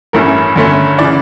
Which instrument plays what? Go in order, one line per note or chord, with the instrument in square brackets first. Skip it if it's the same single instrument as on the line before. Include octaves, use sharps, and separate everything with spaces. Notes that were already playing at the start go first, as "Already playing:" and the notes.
[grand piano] A1 G2 E3 A3 C#4 A#4
G2 D3 A3 C#4
C#3 E3 D5